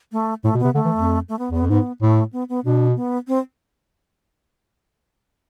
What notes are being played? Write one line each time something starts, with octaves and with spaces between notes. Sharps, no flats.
A3
A2 A3
B2
C3 B3
D3 A3
E3
F2
A3
B3
E2 B3
F2
G#2 B3
A2 A3
B3
B3
B2 D4
B3
C4